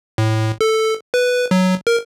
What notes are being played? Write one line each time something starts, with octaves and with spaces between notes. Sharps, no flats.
A2
A4
B4
F#3
A#4